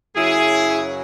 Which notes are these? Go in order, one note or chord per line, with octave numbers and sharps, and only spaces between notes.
F#2 C#3 F#3 E4 G#4